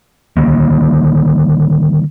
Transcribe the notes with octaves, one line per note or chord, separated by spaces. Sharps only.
D3 D#3 G3 A#3